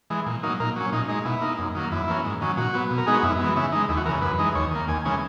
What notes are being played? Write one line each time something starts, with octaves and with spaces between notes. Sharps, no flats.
E3 G#3
A#2
F#3 A#3 D#4
A#2 A#4
F#3 C#4
A#2 D#4
G#3 D#4
B2 E4
A#3 D#4
F#2
D#3 F#3 A#3
F#2 E4
E3 A#3 C#4
G#2
D#3 F#3 C#4
A#2 F#4
F#3 B3
B2
A#4
G#3 B3 D#4 G#4
F#4
F#2 E4
E3 G#3 B3
C#3 E4
G#3 D#4
D#2 E4
F#4
C#3 E3 A#4
F#2 B4
E3 G#3 D#4
D#2 C#5
D#3 A#3
D#2 G#5
C#3 E3 G#3 C#4